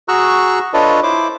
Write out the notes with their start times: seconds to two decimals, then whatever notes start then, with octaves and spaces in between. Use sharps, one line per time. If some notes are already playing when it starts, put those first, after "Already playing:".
0.08 F#4 G#4 A#5 C#6 E6 F#6
0.74 D4 F4 A4 B4 C#5 D#5
1.03 E4 C5 D6